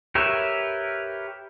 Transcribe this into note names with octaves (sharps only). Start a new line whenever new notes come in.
G4 A#4 B4 C#5 E5